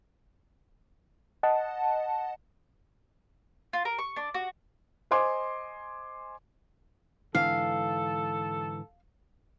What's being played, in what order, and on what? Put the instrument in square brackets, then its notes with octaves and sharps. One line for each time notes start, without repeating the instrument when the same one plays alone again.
[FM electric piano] D#5 F#5 A5
[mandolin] F4
A#4
C#6
D4
F#4
[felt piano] C5 D#5 G#5 C6 D6
[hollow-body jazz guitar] G#2 D3 E3 [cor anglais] A4 [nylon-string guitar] F5